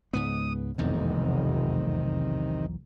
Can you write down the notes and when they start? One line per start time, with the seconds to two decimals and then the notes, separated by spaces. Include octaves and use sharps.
0.13 C#2 G#2 B3 D#6
0.78 F1 B1 E2 G#2 C3 D#3